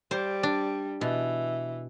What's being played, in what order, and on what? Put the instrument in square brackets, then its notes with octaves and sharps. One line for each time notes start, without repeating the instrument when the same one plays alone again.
[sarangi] G3 [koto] C5
[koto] D4
[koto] B2 [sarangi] E3